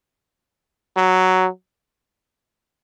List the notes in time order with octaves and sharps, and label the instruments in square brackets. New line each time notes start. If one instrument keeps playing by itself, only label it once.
[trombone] F#3